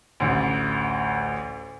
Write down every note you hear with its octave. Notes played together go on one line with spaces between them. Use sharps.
A1 D2